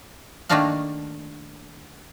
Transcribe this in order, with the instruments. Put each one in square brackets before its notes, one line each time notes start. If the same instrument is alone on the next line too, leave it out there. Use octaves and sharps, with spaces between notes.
[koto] D#3 A3 A#3 D4 F5 F#5